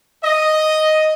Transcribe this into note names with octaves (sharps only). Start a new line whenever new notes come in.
D#5